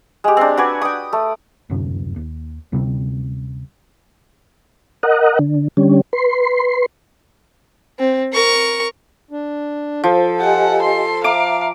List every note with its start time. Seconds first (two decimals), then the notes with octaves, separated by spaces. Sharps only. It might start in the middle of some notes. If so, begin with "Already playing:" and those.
0.24 G#3 G4
0.37 C4 D4
0.57 F#4 B4 D5 G#5
0.82 G5 D#6
1.13 A3
1.70 D1 G1 F#2 C3
2.16 D#2
2.72 D2 C3 G3 C4
5.03 A#4 D#5 F#5
5.39 D3
5.77 D3 G3 C#4
6.13 B4 C6
7.99 C4
8.33 A#4 C#6
9.31 D4
10.04 F3 A4
10.41 G4 D#5 F#5 G#5
10.82 C6
11.24 E5 F5 A#5 D6